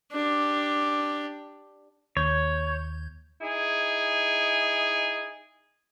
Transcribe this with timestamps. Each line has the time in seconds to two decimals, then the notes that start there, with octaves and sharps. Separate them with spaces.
0.12 D4 G4
2.17 D#2 C#5 G6 G#6
3.41 D#4 E4 G#4